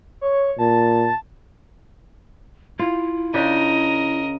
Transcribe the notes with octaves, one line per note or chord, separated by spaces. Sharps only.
C#5
A#2 A5
E4 F4
C#3 D4 A#4 D#5 G5